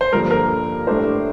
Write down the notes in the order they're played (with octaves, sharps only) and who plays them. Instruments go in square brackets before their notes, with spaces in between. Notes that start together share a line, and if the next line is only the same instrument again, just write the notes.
[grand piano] C5
[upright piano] G2 D3 F3 A#3 [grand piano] A#4
[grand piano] A#4
[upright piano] A2 G3 D4 A4 C5